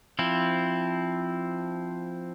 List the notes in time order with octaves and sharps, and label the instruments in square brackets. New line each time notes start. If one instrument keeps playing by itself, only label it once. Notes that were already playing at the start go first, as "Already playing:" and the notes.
[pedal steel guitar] F3 C4 E4